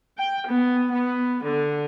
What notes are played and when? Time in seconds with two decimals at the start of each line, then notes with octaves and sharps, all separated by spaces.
0.18 G5
0.48 B3
0.91 B3
1.42 D3